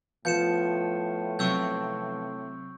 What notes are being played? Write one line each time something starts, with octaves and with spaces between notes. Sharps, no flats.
A2 F3 B3 F4 G6 C#7 E7
C3 F#3 C4 C#6 E6 G6